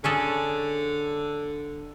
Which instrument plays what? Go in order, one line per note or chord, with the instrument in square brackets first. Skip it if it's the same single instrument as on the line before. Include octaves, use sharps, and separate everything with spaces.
[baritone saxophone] D3 [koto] C#4 G#4 A4